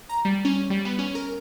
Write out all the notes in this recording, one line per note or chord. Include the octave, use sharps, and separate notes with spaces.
A#5
G3
C#4
G3
B3
C#4
A#4